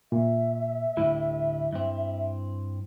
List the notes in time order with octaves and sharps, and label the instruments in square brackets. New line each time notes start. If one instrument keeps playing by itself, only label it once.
[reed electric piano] A#2 [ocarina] E5
[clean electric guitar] D2 A2 G3 [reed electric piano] E4
[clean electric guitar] G2 C4